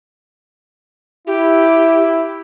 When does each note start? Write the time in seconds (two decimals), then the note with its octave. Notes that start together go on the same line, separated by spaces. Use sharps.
1.27 E4 G4